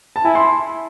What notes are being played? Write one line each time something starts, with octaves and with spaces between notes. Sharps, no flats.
A5
E4 G#5
C6